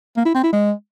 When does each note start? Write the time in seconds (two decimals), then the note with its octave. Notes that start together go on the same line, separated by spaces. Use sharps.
0.17 A#3
0.26 E4
0.35 C4
0.44 E4
0.52 G#3